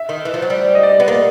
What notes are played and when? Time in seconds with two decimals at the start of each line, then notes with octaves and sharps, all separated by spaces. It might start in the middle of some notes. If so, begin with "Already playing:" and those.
Already playing: E5
0.09 D#3
0.25 E3
0.34 F3
0.42 F#3
0.50 G3
0.75 D#5
0.83 D5
1.00 B3 D5
1.08 A#3